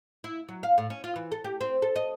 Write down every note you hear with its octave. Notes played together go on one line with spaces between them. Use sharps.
E4
F#3
F5
A2
C#4
F4
E3
A4
G4
C4
A4
D#5